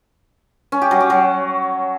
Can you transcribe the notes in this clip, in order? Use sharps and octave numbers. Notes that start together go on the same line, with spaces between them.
C#4
G4
F#3
G4
F#3